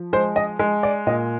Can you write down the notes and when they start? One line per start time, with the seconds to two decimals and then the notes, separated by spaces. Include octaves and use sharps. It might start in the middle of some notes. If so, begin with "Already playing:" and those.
Already playing: F3
0.13 G#3 C5
0.36 D#5
0.59 G#3
0.83 D5
1.07 A#2 D#5